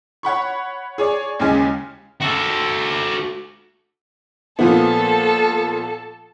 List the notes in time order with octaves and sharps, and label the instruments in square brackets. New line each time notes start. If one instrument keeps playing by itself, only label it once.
[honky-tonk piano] C#5 F#5 B5 C#6
G#4 C#5 D5
D#2 C#3 G#3 C#4 G#5
[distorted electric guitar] F#4 A4
[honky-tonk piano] A#2 F3 B3 [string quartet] A4 A5